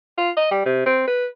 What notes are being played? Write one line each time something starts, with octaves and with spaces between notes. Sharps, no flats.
F4
D#5
G3
C3
C4
B4